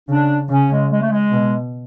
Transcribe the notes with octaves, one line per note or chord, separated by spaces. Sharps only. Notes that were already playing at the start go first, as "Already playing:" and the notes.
C#3 D4
C#3 C#4
G#3
G#3
A3
G#3
B2